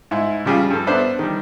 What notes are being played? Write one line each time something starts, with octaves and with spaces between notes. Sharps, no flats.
G#2 E4
C#3 F3 G3 F4 G#4
G2 A4
B3 D4 B4 C5 D5 E5
D#3 G3